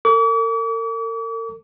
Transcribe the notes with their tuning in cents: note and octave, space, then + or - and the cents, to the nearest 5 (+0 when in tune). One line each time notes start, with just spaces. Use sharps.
A#4 -45 D6 -45